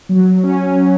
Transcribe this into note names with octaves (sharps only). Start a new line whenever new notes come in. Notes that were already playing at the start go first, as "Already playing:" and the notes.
F#3
C#4
F#3